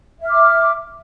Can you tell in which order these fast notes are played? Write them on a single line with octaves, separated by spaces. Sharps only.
E5 F6 D6